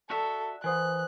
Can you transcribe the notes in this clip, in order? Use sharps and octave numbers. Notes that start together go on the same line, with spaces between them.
F#4 A4 D5 E5
E3 A#4 C5 F#5 G#5 D#6 F#6